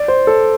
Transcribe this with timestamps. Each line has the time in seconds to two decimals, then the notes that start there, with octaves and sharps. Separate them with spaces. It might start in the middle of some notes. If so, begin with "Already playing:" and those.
Already playing: D5
0.08 C5
0.27 A4